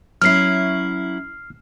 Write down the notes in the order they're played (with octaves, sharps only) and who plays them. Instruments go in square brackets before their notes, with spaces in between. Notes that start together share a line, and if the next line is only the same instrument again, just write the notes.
[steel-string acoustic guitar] F#3 C#4 E4 [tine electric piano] F6 C7